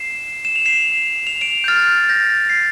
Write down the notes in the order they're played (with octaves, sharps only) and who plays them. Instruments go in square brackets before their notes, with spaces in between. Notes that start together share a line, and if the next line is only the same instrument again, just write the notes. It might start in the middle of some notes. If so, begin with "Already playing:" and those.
Already playing: [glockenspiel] C7 E7
E7
F7
C7 E7
F7
D7 F7
G6
F6 A6
A6
G6 A#6
A6 C7